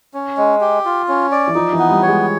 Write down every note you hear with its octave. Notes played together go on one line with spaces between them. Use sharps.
C#4
G#3
G4
F4
C#4
D5
E3
F3 D#4
E3
B3
G3
C#5
G#3